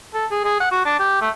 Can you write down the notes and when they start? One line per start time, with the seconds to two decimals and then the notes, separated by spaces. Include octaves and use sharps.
0.14 A4
0.31 G#4
0.44 G#4
0.60 F#5
0.72 F#4
0.85 D4
0.99 G4
1.21 A3